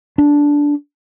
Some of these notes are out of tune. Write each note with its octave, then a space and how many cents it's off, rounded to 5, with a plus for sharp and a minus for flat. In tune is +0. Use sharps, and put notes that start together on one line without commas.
D4 -10